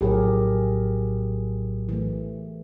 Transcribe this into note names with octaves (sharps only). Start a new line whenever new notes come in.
A#1 A2 F#3 G4 G#4 A#4
E3 A3